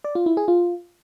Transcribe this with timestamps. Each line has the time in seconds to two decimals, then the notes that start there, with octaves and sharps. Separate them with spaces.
0.04 D5
0.15 F4
0.26 E4
0.37 G#4
0.48 F4